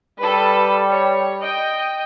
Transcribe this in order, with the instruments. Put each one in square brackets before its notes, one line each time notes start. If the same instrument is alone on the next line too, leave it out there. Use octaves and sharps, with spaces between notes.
[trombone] G3 [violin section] A4 B4
[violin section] C#5
D#5 G5